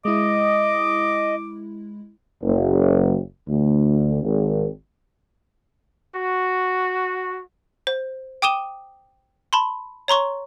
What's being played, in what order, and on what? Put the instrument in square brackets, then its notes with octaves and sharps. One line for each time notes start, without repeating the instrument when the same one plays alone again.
[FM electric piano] G#3 E4 [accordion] D#5 [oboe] D6
[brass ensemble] F#1
D2
G#1
[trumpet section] F#4
[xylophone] C5
G5 D6 D#6 D#7 E7 G7
A5 B5 C6
C#5 A#5 C6 C#6